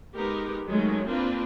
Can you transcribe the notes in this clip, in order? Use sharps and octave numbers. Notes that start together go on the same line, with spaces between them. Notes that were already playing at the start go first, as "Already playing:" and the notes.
G#3 B3 D#4 G4 A#4
D#3 F#3 G#3 A3 C#4
A#3 C4 D4 F4 A#4 B4